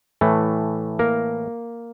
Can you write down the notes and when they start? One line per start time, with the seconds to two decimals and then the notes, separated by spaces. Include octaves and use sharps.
0.21 A2 E3 A3
0.99 A#3 A#4